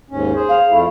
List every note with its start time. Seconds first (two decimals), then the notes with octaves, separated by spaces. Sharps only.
0.11 D#2 G#2 C#4
0.35 G#4 C5
0.49 F5
0.71 F2 A3 E4